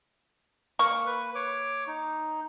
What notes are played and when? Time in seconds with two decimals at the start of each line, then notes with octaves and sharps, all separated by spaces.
0.79 A#3 C#6
1.06 B4
1.35 C#5 D6
1.87 D#4